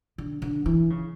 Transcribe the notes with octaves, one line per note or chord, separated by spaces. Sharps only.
D3
D3
E3
C#3